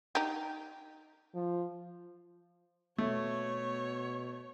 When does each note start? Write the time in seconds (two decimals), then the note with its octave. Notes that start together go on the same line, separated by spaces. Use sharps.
0.15 D#4 G4
1.35 F3
2.98 B2 A3 C#5